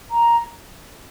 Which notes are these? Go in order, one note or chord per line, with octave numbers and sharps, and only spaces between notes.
A#5